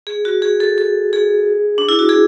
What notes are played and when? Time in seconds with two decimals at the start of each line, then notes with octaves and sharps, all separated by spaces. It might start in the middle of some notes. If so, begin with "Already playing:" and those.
0.07 G#4
0.25 F#4
0.42 G#4
0.60 A4
0.78 A4
1.13 G#4
1.78 D4
1.89 E4
1.99 F#4
2.09 G#4